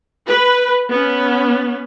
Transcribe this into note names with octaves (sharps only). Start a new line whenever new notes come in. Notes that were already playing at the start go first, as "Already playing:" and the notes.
B4
B3 C#4